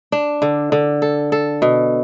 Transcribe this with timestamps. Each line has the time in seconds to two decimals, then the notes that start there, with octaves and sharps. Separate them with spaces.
0.12 D4
0.42 D3
0.72 D3
1.02 A4
1.32 A4
1.62 B2